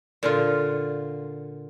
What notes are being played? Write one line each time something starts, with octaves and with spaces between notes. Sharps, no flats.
A#2 D3 F4